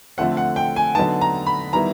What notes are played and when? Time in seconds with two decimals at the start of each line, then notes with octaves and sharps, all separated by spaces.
0.18 D3 F3 A3 C4 F#5
0.37 F#5
0.56 G5
0.76 G#5
0.95 D3 F#3 B3 D#4 A5
1.21 A#5
1.46 B5
1.73 D#3 G3 B3 E4 A#5